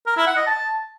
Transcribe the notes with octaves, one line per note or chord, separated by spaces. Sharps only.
A#4
E4
F#5
D#5
A5